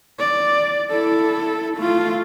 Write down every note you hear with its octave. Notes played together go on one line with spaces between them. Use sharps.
D5
E4 A4
A3 F4